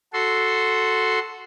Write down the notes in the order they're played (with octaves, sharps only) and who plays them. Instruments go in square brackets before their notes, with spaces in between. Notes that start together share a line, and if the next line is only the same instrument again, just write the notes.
[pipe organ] F#4 A4 C6